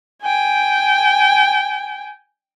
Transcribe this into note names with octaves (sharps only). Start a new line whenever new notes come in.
G5 G#5